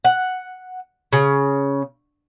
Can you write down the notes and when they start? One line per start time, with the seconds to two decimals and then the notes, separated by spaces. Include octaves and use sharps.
0.04 F#5
1.13 C#3